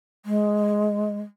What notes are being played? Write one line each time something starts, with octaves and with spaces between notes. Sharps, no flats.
G#3